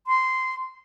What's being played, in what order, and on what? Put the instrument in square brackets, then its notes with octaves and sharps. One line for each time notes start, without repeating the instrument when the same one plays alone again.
[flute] C6